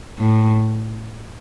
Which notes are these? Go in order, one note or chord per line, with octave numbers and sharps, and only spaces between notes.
A2